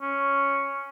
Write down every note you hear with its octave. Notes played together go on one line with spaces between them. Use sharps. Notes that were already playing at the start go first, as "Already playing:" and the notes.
C#4